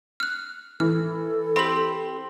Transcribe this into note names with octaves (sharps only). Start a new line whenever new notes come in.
F6 F#6
E3 A4 F6
C4 G4 B5 F#7